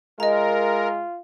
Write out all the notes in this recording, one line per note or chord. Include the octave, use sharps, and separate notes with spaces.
G#3 F4 A#4 D#5 A#5